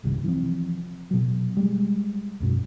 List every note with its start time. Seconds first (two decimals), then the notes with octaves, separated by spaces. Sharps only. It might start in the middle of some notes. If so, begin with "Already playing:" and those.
0.04 G1 C2 C3 D#3
0.24 E3 F3 C4
1.11 B2 F#3
1.57 G3 G#3
2.40 C#2 F#2 B2